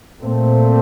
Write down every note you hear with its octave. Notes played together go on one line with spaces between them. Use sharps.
A#2 A3 C4